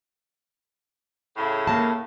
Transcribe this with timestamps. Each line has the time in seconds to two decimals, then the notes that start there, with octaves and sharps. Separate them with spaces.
1.37 A2 C#3
1.67 A#3 A5